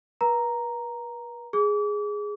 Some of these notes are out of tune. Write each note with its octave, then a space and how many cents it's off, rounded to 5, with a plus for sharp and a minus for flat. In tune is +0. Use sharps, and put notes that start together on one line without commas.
B4 -40 A#5 +0
G#4 +0 D6 -35